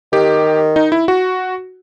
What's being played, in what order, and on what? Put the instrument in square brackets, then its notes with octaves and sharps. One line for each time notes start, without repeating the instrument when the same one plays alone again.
[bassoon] D#3 [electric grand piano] G4
[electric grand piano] D#4
E4
F#4